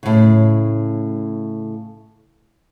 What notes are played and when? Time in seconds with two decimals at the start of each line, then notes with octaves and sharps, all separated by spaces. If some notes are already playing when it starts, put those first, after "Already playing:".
0.03 A2 C#3